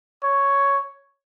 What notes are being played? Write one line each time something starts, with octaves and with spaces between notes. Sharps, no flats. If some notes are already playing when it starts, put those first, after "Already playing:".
C#5